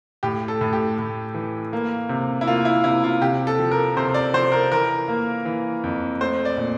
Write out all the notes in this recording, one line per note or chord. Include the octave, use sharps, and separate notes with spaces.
A2 G4
A4
A2
G4
A2
E3
A#3
C3
E4
A#3 F4
E4
C3 E4
F4
C3 G4
A4
F3
A#4
C3 C5
D5
F3 C5
A#4
E3 A#4
A#3
E3
F2
A3 C5
D5
A#2